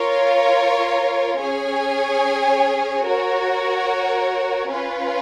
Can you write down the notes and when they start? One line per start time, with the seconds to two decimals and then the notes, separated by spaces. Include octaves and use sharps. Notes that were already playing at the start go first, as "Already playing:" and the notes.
Already playing: F4 A#4 C#5
1.39 C#4 G#4 C#5 G#5
3.05 F#4 A#4 C#5
4.71 C#4 F4 B4